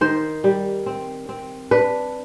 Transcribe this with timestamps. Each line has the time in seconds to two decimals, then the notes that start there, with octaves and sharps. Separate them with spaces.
0.01 D#3 C5
0.44 G3
0.86 C4
1.29 C4
1.71 D4 B4